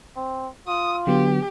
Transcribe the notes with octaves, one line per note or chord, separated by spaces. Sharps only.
C4
F4 D#6
D3 F#3 B3 G4